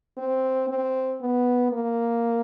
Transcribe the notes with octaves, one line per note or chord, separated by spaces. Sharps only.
C4
C4
B3
A#3